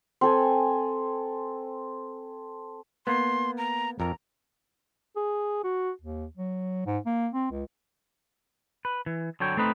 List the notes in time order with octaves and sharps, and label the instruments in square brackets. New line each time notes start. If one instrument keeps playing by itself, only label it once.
[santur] C4 A4 G#5
[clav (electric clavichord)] A#3 B3 [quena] C6
[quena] A#5
[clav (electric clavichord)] F2 A#4 [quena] A#5
[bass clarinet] G#4
F#4
D#2
F#3
G#2
A#3
C4
C#2
[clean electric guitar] B4
E3
D3 F#3 C#5 G5
A3 C4 D#4 B4